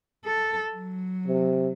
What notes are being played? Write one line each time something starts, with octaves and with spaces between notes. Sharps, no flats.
A4
F#3
C3